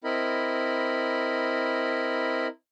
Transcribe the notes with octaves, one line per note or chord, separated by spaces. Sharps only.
C4 E4 A#4 D#5 B5